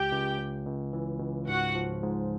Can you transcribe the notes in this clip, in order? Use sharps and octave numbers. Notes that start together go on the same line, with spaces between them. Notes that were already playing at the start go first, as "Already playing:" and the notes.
Already playing: C#2 G4 G5
C#2
C#2
C#2
E3
C#2
G#2 F#4 F#5
F3
G#2